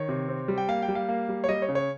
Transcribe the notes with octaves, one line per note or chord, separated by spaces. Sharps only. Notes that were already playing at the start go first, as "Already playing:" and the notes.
Already playing: D#3 C#5
C3
C4
G3
G5
A#3 F5
G5
G3
F5
A#3
G3
C#5
G3 D#5
C#5
C#3
C#5